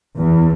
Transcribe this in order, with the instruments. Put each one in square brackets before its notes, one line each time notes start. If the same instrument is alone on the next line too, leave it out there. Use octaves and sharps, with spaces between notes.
[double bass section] E2